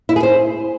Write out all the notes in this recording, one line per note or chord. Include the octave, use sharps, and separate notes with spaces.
E4
G#4
C5